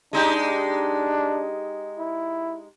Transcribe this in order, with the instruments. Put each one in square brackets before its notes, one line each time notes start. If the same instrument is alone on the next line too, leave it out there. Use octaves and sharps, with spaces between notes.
[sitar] G#3 D#4 G4 [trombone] D4
[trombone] E4